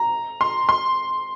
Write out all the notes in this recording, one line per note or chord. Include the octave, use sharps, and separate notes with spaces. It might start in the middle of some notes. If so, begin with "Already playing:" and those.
Already playing: A#5
C6
C6